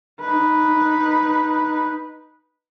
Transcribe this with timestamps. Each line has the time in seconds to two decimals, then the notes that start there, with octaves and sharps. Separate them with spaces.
0.21 D#4 B4